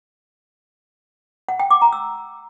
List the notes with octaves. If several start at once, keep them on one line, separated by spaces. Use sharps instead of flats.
F#5
G5
D6
A#5
E6